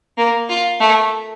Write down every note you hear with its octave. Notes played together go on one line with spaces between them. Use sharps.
A#3
F4
A3